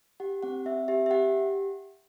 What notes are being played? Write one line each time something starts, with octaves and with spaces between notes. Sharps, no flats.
G4 F#5
C4 F#5
C4 E5
G4 E5
E5
G4 F#5